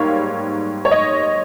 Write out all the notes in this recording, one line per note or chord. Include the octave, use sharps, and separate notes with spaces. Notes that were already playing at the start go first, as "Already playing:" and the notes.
Already playing: G#2 G3 A#3 C#5 F5
C#5
D#5